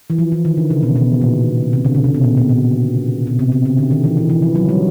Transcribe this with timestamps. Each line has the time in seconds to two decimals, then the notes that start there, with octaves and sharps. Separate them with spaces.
0.10 E3
0.18 F3
0.32 E3
0.45 D#3
0.57 D3
0.70 C#3
0.83 B2
0.96 B2
1.21 A#2
1.73 C3
1.84 D3
1.94 C#3
2.04 C3
2.14 B2
2.23 A#2
2.37 B2
2.49 A#2
3.27 B2
3.39 C3
3.52 C3
3.65 C#3
3.78 D3
3.91 D#3
4.04 E3
4.17 E3
4.30 E3
4.42 F3
4.55 F#3
4.69 G3